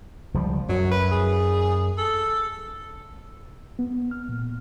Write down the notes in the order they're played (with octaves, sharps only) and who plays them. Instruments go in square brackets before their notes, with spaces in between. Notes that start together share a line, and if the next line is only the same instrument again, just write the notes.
[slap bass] C#2 F3 G3
[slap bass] F#2 [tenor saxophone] F#3
[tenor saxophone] B4
G#4
A4
[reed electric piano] B3
F6
A#2